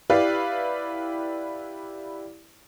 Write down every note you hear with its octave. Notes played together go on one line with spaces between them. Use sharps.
E4 G4 B4 D5 F5